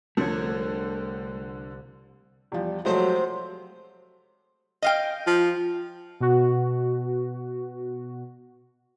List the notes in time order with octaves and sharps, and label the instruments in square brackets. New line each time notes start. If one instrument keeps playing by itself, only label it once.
[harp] C2 [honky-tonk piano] D3 F3 [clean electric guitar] A3 C#5
[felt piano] E2 F3 [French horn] G3
[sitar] C3 C5 [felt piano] F3 G#3 A3 [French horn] F#3
[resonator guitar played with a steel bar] D#5 F5 G5
[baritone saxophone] F3
[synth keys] B2 F#4